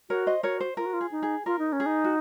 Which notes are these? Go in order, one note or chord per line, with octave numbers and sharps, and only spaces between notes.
F#4 A#4 C#5
C5 D#5
F#4 A#4 C#5
C5
F4 A#4
F#4
F4
G#4
D#4
G#4
F4 A#4
D#4
C#4
G#4
D#4
F#4